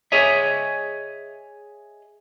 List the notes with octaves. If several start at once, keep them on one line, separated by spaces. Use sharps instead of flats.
G#4 C#5 D#5 E5